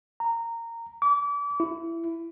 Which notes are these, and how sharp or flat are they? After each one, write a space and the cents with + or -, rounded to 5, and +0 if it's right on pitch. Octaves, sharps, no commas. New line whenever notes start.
A#5 -15
D6 -35
E4 +15